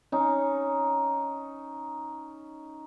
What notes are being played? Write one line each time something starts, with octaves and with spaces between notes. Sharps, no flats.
C#4 D#4